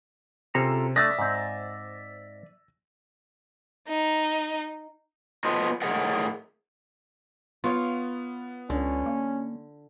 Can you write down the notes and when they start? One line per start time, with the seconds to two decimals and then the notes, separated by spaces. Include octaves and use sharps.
0.55 C3 C#4 F4 G#4 A4 C5 A#5
0.96 A3 D4 D5 E5 D#6 E6 A6 A#6
1.19 G#2 C4
3.88 D#4
5.45 B3 F4 F#4 A4 C5 D#5
5.82 A2 G#4 A#4 D#5 F#5
7.64 B3 F4 C#5 F5
8.70 C#2 D3 C#4
9.06 A#3